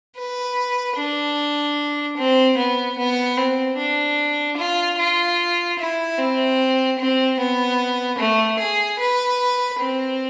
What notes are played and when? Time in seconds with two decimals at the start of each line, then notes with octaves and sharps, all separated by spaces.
0.17 B4
0.97 D4
2.17 C4
2.57 B3
2.98 B3
3.37 C4
3.77 D4
4.57 F4
4.98 F4
5.79 E4
6.18 C4
6.99 C4
7.39 B3
8.18 A3
8.59 G#4
8.99 B4
9.80 C4